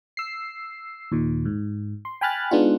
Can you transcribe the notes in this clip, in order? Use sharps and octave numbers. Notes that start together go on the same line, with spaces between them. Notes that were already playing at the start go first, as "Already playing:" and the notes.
E6 C7
D#2 A#2 D#3
G#2
C6
G5 G#5 B5 F6 F#6 A6
G#3 B3 D4 D#4 F4 F#5